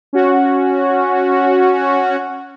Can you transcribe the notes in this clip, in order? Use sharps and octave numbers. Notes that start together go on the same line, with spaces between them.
C#4 F#4